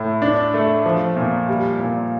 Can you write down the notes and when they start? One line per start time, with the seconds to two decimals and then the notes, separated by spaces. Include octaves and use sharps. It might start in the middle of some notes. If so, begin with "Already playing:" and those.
Already playing: A2
0.22 D4
0.54 A3
0.85 F3
1.16 A#2
1.49 G3
1.80 A#2